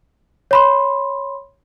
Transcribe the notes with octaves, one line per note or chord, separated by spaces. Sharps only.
C#5 B5 C6